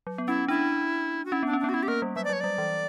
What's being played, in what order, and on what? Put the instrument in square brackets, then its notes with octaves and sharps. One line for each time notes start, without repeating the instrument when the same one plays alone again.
[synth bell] F#3
B3
[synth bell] C#4 [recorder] E4
[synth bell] D4 [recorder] E4
[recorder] F#4
[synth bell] C#4 [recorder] E4
[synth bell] B3
[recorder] D4
[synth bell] C#4
[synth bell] B3 [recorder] D4
[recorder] F#4
[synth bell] C#4 [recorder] E4
[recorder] G4
[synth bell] A#3 [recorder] A#4
[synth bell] G3
[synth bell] F#3 [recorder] E5
[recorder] D5
[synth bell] F#3 [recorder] C#5
[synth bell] G3 [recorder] D5
[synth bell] E3